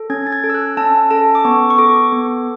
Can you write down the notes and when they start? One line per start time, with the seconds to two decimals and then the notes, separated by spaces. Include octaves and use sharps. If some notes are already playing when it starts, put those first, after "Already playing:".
Already playing: A4
0.10 C#4 G#6
0.27 A6
0.32 G#6
0.44 A4
0.50 E6
0.54 F#6
0.77 C#4 A5
1.10 A4 A5
1.35 D6
1.45 B3 C#6
1.70 C#6
1.78 A4 D6
2.12 B3